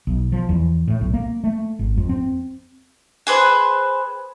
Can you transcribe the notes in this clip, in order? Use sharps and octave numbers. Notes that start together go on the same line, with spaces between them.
B1
F3
E2
A2
B1
A#3
A3
G#1
F2
C4
G#4 B4 C5